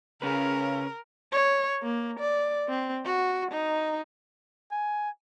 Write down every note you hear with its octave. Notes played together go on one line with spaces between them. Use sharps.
C#3 C#4 A#4 B4
C#5
A#3
D5
C4
F#4
D#4
G#5